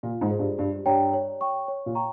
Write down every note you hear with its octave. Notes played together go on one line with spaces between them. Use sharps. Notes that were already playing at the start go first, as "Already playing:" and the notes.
A#2 F4
G#2
G#4 C5
G2
G2 G4
G2 C#5 G5 A#5
C#5
G5 C#6
C#5
A#2
G5 A#5 C#6